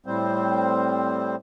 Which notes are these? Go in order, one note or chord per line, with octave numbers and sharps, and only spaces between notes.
A2 G3 C4 C5